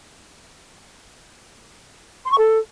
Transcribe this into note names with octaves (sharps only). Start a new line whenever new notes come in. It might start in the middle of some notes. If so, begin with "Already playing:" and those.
C6
C#6
A4